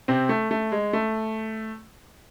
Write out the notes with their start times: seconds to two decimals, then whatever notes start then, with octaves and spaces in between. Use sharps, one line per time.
0.08 C3 C4
0.29 A3
0.51 A3
0.72 G#3
0.93 A3